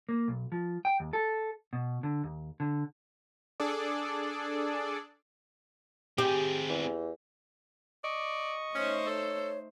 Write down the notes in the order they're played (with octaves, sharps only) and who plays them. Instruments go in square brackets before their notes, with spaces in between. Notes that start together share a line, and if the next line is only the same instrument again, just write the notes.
[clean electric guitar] A#3
B1
F3
G5
D#2
A4
B2
D3
D#2
D3
[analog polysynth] D4 G#4 A4 D5
[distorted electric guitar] C4 G#4 [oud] G4
[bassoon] E2
[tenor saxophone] D5 [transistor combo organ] D#5 C#6
[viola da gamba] A3 D#4 C5 [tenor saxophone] C#4 [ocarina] C#5
[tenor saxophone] A4 [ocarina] C#5